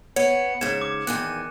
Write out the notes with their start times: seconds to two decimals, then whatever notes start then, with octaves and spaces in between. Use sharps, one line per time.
0.16 B3 C#5 C#7
0.61 G#2 C#3 G#6 E7
0.81 D6
1.07 E2 D#3 G#5 F#6